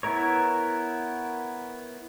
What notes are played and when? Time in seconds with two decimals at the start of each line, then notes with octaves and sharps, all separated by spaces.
0.03 B3 E4 A#4 C#5